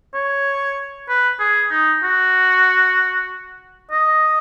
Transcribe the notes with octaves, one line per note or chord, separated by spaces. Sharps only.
C#5
B4
G#4
D#4
F#4
D#5